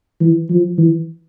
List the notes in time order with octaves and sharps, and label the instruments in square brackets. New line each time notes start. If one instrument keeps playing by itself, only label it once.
[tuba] E3
F3
E3